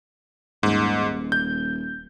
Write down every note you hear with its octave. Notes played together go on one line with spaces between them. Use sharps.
D#1 G#2
G6